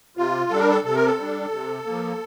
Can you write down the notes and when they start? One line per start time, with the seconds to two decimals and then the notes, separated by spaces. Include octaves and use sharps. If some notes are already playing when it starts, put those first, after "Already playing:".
0.17 C3 F4
0.51 G3 D4 A4
0.59 A#4
0.69 A4
0.84 C3 A4
0.95 A#4
1.06 A4
1.18 G3 D4
1.52 C3
1.86 F3 A#3